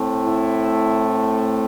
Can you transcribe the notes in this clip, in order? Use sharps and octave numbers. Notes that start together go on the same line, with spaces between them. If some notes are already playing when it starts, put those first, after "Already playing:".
Already playing: A2 A3 C4
E4